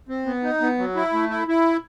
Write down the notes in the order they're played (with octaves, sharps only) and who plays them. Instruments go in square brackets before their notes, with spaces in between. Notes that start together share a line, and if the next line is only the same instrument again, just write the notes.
[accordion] C4
B3
D#4
B3
F#3
E4
A3
E4
E4